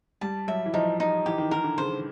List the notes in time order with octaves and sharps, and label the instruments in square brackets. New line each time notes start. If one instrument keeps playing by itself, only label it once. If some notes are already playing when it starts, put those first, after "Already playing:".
[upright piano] G3 [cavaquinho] A5
[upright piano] F#3 [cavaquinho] E5
[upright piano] E3
[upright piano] F3 [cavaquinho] D#4
[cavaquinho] D#4
[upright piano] E3 [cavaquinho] G4
[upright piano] D#3
[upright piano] D#3 [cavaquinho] A#4
[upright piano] D3
[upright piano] C#3 [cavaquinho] C5